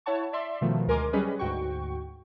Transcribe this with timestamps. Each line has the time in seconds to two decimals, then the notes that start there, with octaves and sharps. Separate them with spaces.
0.06 E4 C#5 F#5 A5 C#6
0.33 D5 E5 C6
0.61 B2 D#3 F3 A3
0.87 D2 G#3 A#4 G#5 C6 D6
1.13 F#3 G3 C#4 G#4 B4 D#5
1.39 D2 G#2 F#4 G5 C#6